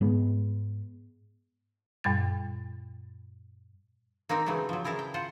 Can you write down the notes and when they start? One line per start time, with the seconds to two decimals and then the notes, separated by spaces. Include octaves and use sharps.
0.01 G#2 G#3 B3
2.04 F#2 A#2 G3 A6
4.29 A#3 C4 D#4 A#4
4.46 C#3 E3 F#3 G#3 A3
4.69 F3 F#3
4.84 C#3 E4 A#4 F5 A5
4.99 G5
5.14 F4 C5 F#5